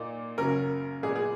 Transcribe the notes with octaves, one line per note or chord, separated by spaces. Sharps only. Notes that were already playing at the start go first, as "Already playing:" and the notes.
Already playing: A#2 A#3 D#4
F#2 C#3 F#3 C#4 A#4
A#2 G#3 B3 G#4
G#4